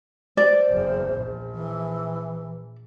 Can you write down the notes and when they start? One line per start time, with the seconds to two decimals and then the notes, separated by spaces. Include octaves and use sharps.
0.37 C5 D5
0.70 F#1 E2
1.12 A#1
1.54 E3